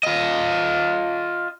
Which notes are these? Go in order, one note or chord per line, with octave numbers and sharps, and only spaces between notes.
F4 D#5